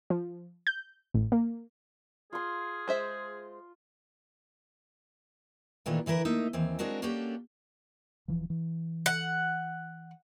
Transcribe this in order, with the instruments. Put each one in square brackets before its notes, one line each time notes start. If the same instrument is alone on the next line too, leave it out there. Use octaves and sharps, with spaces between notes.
[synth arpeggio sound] F3
G6
A1
A#3
[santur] F4 C6 [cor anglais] G#4
[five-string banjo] G#3 C5 E5
[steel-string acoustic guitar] A#2 D#3 E3 A3 D4 F4
D3 E3 E4 A#4 B4
A3 A#3 D#4 E5
D#2 E3 C4 G#5
G#3 C4 D4 F#4 A#4
A#3 C#4 D4 F#4 G4 A4
[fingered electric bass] D#1 E3 F3
E3
[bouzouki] F#5